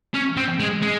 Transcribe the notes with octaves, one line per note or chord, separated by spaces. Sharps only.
C#4
C4
G#3
G#3